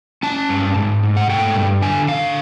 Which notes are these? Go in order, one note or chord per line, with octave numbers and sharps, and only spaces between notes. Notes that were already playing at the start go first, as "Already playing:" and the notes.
C#4 A5
G2
G#2
G#2
F#5
A3 G5
G2
D3 G#5
D3 F5